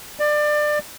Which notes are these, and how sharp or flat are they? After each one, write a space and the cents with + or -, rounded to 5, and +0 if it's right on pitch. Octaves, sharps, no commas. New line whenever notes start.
D5 +25